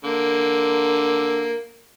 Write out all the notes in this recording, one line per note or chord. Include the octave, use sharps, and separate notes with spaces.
D3 A#3